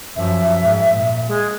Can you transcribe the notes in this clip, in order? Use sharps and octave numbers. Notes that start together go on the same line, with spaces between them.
F#2 F3 E5
G#2
A#2
G#3